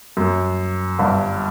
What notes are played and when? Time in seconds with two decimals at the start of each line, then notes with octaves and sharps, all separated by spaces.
0.17 F#2
0.99 G1 G2